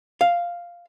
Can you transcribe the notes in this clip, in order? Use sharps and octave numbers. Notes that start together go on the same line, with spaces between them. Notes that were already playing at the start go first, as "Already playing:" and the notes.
F5